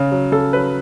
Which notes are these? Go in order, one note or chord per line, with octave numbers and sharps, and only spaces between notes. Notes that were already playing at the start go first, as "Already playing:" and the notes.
Already playing: C#3
F#3
C#3 A4
F#3 B4